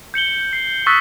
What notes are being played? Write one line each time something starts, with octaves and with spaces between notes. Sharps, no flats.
G6 C#7 F#7 G7
C7
C#6 D#6 E6 F#6 A6 B6